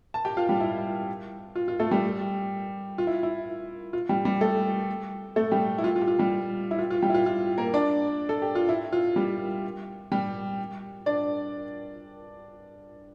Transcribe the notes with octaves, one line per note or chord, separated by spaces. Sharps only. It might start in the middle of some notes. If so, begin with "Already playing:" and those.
A5
G4 G5
F4 F5
G3 G4
E4
F4
F4
A3 A4
G3 G4
F4
E4
E4
F4
G3 G4
G3 G4
A3 A4
A3 A4
G3 G4
E4
F4
F4
G4
F4
G3 G4
E4
F4
F4
G3 G4
E4
F4
F4
A#3 A#4
D4 D5
A4
G4
F4
E4
F4
G3 G4
G3 G4
D4 D5